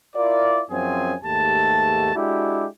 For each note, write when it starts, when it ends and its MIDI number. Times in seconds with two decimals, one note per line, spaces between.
0.16 0.62 64
0.16 0.62 65
0.16 0.62 70
0.16 0.62 74
0.71 1.14 42
0.71 1.14 53
0.71 1.14 60
0.71 1.14 61
0.71 1.14 68
0.71 1.14 80
1.24 2.10 39
1.24 2.10 44
1.24 2.10 57
1.24 2.10 67
1.24 2.10 81
2.15 2.65 56
2.15 2.65 62
2.15 2.65 64
2.15 2.65 66
2.15 2.65 67